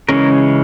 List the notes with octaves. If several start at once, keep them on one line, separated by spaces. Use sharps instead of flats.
C#3 E3 G#3 C#4 A#4